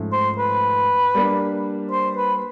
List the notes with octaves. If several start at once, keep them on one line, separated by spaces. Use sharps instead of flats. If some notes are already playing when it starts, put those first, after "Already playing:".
Already playing: G#2 F3 A3 C#4
C5
B4
G3 A#3 D4
C5
B4